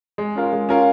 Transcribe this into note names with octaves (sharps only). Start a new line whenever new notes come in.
G#3
C#4 F4 A#4 F5
G#3
C#4 F4 A#4 F5